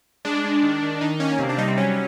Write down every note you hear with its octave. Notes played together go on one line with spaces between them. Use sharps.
G#3 D4
G#3
D#3
D#3
D#3 D#4
A#3 C#4
C3 C4
D4
G3 D#4
C4
F#3 C#4